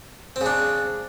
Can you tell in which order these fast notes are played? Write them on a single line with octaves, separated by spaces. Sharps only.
C4 C#3 D4